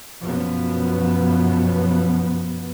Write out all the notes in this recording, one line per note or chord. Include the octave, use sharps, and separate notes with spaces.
F#2 B2 F3 B3